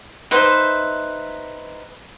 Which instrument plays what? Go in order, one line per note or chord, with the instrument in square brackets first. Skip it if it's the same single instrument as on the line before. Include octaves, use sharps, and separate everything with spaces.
[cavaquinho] D#4 B4 C5 E5